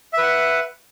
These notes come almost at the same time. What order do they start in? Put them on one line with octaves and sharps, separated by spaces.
E5 B4 F#5